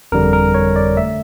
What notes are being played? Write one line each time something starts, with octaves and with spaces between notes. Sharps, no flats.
G1 F2 D3 G3 A#4
A#4
C#5
D5
D3 A3 E5